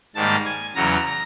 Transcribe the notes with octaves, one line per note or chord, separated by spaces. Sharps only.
G#2 D#3 G3 A#3 A5
G#5
E2 C#3 F#3 A#5